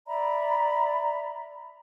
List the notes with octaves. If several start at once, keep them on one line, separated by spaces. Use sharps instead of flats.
D5 E5 A#5 B5